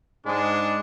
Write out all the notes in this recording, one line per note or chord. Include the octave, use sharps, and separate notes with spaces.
G#2 G#3 D4